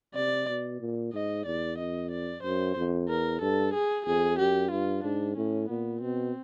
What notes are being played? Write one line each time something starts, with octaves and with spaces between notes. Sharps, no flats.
C3 D5
B2
A#2
G#2 D#5
E2 D5
F2 D#5
D5
F#2 C5
F2
E2 A#4
G2 A4
G#4
F2 G#4
F#2 G4
G2 F4
G#2 D4
A2 C#4
A#2 B3
B2 C4